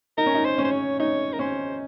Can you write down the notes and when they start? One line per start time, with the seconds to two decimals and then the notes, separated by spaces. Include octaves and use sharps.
0.18 D#4 A#4
0.26 C#4
0.35 D#4
0.45 C5
0.58 C#4
0.64 C5
0.72 C#5
0.99 D#4 C#5
1.33 A#4
1.39 C#4 C5